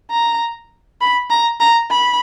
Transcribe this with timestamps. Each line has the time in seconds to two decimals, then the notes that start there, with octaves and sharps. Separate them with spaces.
0.11 A#5
1.01 B5
1.30 A#5
1.60 A#5
1.91 B5